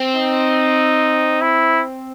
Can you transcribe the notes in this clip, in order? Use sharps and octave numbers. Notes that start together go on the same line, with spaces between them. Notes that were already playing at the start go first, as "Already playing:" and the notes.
Already playing: C4
D#4
E4